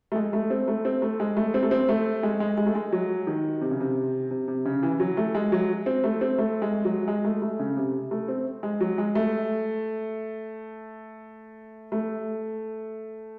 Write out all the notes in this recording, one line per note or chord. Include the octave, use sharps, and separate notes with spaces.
A3
G#3
A3
C4
A3
C4
A3
G#3
A3
C4
A3
C4
A3
G#3
G#3
G#3
A3
G#3
F#3
D#3
C3
C#3
C3
C3
C3
C#3
E3
F#3
A3
G#3
F#3
C4
A3
C4
A3
G#3
F#3
G#3
A3
A3
C#3
C3
A3
C4
G#3
F#3
G#3
A3
A3